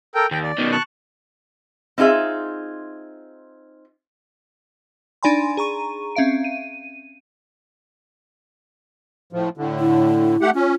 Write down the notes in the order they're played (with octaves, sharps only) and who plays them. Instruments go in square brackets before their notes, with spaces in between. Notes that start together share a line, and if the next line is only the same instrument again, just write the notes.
[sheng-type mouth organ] A4 A#4 G5
[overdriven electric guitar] D#2 [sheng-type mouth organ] G5
[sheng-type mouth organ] D5
[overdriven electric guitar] B2 D#3
[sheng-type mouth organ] A5 C#6 F#6
[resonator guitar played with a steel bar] C4 D#4 F4 G#4 E5
[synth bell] D4 D#4 D5 G#5 B5 C6
G#4 A#5 C#6 D#7
C4 C#4 E5 F5 D7
D#7
[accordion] A2 F3
A2 D3
[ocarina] E4
[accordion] A3 G4 F#5
[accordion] C#4 [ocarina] F4